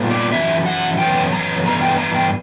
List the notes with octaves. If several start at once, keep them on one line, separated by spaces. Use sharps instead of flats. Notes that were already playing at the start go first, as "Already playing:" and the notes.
Already playing: A#2 G3 B3
D5
F#2 E3 E5
F#5
F#2 E3 B3 G5
A#5
G2 E3 B3 A#5
G5
A#5
G5